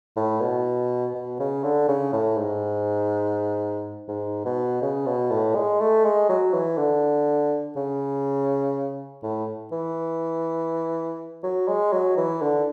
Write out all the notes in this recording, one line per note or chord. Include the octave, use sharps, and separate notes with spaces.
A2
B2
B2
C#3
D3
C#3
A2
G#2
G#2
B2
C#3
B2
A2
G#3
A3
G#3
F#3
E3
D3
C#3
A2
E3
F#3
G#3
F#3
E3
D3